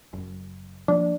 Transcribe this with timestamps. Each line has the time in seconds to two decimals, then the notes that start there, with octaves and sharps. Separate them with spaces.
0.13 F#1 F#2
0.88 F3 G#3 A#3 D4